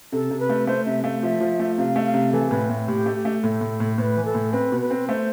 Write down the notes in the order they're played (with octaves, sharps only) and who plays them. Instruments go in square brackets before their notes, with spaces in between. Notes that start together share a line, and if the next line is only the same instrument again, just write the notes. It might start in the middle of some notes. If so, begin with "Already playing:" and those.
[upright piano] C3 [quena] A4
[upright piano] C3
[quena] B4
[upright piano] A3
[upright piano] A3 [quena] C5
[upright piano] C3 [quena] E5
[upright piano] A3 [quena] F5
[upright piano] F3 [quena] E5
[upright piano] F3
A3
[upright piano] C3 [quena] F5
[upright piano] A3
[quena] F5
[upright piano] C3
[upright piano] E3 [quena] A4
[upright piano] A2 [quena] B4
[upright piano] A2
[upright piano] A2 [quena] G4
[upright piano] A3
[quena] G4
[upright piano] A3
[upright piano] A2 [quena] A4
[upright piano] A2
A2
[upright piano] A2 [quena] B4 C5
[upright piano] E3
[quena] A4
[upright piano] A2
[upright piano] C4 [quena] B4
[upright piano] B2
[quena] B4
[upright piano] C4
[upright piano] A3 [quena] C5